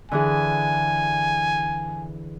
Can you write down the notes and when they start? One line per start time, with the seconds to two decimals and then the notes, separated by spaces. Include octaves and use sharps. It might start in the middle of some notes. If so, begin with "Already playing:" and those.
0.11 D3 E3 G#4 G#5